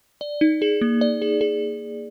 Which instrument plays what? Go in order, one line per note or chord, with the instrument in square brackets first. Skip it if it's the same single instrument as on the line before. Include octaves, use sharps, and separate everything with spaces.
[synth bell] D5
D#4
G#4
A#3
D5
G#4
G#4